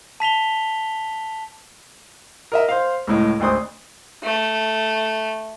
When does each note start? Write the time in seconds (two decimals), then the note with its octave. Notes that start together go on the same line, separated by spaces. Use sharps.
0.20 A5 B6 F7 G7
2.52 A#4 D#5 E5
2.69 C5 F5
3.07 C#2 A2 D#5
3.40 G#1 D2 C5 D#6
4.23 A3